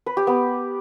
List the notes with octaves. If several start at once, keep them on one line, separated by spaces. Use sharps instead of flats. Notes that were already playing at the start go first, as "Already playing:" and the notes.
B4
G4
B3